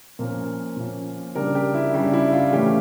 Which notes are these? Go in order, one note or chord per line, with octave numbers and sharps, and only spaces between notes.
A#2 F3 A#3 C#4 A#4
A#2 F3 A#3 C#4
C#3 G3 D4 A#4
G4
E4
C#3 G3 D4
E4
F4
A2 E3 A3 C#4 G4